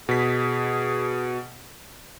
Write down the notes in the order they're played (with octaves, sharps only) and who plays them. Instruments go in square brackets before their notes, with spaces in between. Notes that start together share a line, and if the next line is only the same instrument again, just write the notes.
[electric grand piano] B2 B6 [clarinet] G#4